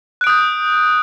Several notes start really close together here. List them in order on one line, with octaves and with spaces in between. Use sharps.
F#6 D7 D#6 G6